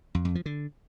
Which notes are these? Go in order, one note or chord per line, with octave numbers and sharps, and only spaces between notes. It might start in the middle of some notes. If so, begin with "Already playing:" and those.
F2
F2
F3
D3